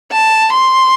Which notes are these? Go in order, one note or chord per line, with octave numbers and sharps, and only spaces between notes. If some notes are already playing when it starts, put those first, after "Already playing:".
A5
C6